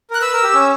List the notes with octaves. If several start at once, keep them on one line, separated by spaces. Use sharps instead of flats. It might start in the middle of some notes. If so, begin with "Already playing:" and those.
A#4 F#6
B4 E6
A#4
G4
C#4